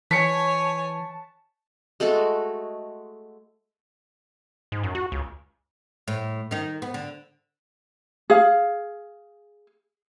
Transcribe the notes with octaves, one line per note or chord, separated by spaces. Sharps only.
E3 C#5 G#5 A5 B6 C#7
G#3 A3 F#4 A4
G#2
F#2
F#4
C#2
A2
D#3 D#4
B3
D3
G#4 F5